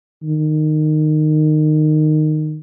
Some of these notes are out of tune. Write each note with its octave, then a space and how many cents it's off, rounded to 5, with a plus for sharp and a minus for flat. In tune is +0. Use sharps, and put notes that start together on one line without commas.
D#3 -20